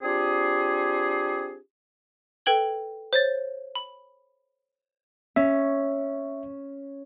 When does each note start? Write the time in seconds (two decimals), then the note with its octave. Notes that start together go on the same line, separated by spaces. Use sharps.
0.02 C4 D4 F4 G4 G#4
2.46 A4 B4 G5 G#6 F#7 G7
3.13 C5 C#5 A6
3.75 B5
5.36 C#4 E5